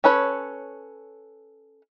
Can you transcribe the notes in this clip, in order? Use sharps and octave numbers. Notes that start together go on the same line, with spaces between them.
C#4 A4 B4 C#5